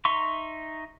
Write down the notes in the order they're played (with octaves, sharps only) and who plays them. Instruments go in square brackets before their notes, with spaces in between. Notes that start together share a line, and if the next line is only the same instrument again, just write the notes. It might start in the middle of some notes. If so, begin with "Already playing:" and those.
[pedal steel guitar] D#4 E5 A#5 C6 C#6